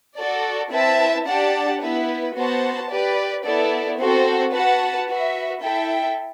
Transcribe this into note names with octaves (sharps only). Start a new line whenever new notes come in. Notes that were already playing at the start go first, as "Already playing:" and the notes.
F#4 A4 D5
C4 E4 B4 E5 A5
D4 G4 D5 F#5 A5
B3 E4 B4
B3 F#4 C5 F#5 A5
G4 B4 D5
B3 E4 A4 D5
C4 F#4 A4 C5
F#4 B4 F#5 A5
F#4 B4 E5
E4 A4 E5 G5